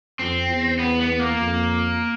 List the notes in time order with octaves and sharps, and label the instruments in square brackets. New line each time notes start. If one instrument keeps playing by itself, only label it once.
[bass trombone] F2 [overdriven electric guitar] C4
[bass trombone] E2
[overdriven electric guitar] B3
B3
A#3
[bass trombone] F2